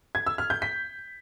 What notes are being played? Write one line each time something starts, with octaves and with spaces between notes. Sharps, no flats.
G#6
E6
F6
G6
B6